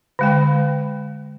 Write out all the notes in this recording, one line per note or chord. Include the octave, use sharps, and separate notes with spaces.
D3 G#3 G5